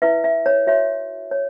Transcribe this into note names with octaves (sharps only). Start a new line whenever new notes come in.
E4 B4 E5
E5
C#5
F#4 C#5 E5
C#5